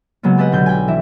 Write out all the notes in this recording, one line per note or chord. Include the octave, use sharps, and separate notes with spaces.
C#3 F#3 G#3 A#3 B3
G4 A4 B4 D#5 F#5
B1 D3 G6
G5 G#5
E3 E5